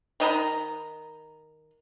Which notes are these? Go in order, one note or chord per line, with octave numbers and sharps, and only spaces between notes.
D#3 D#5 A#5 B5